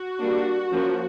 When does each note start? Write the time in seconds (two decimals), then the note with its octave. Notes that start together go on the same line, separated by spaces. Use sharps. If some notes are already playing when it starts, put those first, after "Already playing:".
Already playing: F#4
0.20 G3 A#3 D4
0.72 F3 A#3 C#4